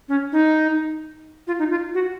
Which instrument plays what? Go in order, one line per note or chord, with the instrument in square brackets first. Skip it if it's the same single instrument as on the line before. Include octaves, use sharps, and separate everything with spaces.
[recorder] C#4
D#4
F4
D#4
F4
F#4